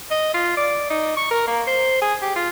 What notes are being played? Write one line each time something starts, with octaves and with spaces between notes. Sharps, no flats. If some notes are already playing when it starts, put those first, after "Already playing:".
D#5
F4
D5
D#4
C#6
A#4
A#3
C5
G#4
G4
F4